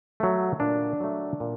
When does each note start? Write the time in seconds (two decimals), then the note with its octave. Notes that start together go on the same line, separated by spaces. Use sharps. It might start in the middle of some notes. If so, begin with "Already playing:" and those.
0.20 F#3 A3
0.60 A#2 D4
1.00 F#3 A3
1.40 A#2